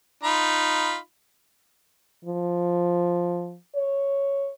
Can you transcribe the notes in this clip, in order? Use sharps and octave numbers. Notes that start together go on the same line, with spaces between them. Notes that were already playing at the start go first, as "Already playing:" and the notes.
D#4 F4 B5
F3
C#5